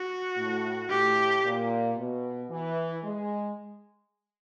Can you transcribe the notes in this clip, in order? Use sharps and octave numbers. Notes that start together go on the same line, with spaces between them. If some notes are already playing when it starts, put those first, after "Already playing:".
Already playing: F#4
A2
A2 G4
A#2
B2
E3
G#3